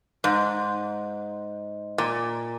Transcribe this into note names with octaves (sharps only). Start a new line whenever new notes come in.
G#2
A#2